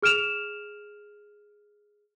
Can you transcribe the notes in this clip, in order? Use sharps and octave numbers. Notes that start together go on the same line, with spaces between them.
G#4 F6 D7 E7 F7